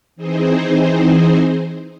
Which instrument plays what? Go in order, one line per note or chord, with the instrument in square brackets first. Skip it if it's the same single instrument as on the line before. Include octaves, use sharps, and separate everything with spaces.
[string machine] E3 C4 D#4 G#4 C5